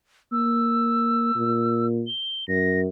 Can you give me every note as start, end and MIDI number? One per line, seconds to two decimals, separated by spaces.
0.32 1.34 58
0.32 1.86 88
1.36 2.04 46
2.07 2.47 103
2.48 2.88 42
2.48 2.80 94